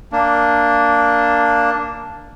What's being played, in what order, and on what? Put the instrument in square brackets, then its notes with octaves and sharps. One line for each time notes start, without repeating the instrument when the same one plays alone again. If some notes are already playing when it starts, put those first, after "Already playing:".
[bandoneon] A#3 D4